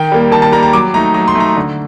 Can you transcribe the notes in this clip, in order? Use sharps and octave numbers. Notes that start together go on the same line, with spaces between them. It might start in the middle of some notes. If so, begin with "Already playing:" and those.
Already playing: D#3 G5
G3 A#3
D#3 A5
A5
G3 A#3 A#5
A#5
F#3 D6
A3 D#4 A#5
F#3 A#5
C6
A3 D#4 A#5
D3